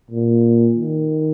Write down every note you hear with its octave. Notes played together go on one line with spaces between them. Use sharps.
A#2
D#3